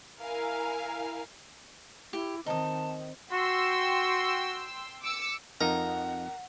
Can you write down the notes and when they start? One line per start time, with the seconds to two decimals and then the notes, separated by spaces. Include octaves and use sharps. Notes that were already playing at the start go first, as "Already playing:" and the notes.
0.21 E4 A#4 F5 G#5
2.13 E4 G4
2.46 D#3 C4 D#4 A5 D#6
3.32 F#4 G5 C6 E6
5.02 D6 E6 C#7
5.61 F2 D#4 A#4 F#5